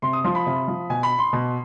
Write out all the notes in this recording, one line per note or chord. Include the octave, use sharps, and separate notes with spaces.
C3 C6
D#6
F3 C6
B5
C3
F3
B2 G#5
B5
C6
B2